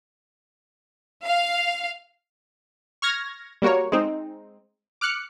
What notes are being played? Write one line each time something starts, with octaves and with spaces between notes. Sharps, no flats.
F5
C#6 F6 G#6 A#6
G3 A#3 F#4 A#4 C#5
G#3 C4 D#4
D6 F6 F#6 C#7